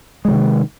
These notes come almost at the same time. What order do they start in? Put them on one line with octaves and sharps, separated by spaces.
G#3 E3 C3 D#3